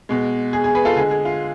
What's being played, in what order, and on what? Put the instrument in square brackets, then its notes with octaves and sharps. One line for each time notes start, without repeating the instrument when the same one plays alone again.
[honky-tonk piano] B2 G#3
G#4
G#4
G#4 B4
F4 A4
D3 G#3 G#4
G#4
F4